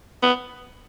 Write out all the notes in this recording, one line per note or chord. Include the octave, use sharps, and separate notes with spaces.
B3